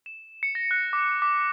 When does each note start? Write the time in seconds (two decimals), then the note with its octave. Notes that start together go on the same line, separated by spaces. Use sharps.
0.06 E7
0.43 C#7
0.55 A#6
0.71 F#6
0.93 D6
1.22 D6